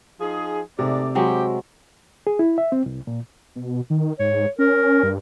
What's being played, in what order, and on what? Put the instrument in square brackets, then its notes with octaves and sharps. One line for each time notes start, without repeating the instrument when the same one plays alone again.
[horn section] F3 D#4 G#4
[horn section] G#2 A3 D5 [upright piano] C3
[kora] F#3 G#3 C4 [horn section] G4
[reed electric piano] G#4
E4
E5
C4
C2
A#2
[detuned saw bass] B2
D#3
[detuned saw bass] G#2 [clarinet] C#5
[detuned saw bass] C#4 [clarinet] A#4
[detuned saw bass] G2